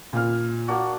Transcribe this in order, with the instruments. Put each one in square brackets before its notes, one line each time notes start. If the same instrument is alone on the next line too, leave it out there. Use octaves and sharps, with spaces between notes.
[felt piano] A#2 F6
[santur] A#3 D4 F#4